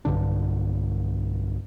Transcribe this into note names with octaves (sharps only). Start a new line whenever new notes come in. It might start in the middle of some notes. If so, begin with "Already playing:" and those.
B1 G2 D3 D4